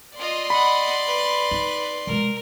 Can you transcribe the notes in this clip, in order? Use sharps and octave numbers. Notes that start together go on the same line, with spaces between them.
F4 D5 D#5 C6
D#5 F#5 B5
B4
D#4
B2 G#3 A#4